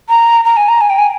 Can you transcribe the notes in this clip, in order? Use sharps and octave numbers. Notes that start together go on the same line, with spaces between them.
A#5
A#5
G#5
A#5
G#5
G5
G#5